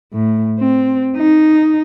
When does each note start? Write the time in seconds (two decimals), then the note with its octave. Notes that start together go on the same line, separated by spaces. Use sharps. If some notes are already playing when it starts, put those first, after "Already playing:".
0.13 A2
0.59 C4
1.17 D#4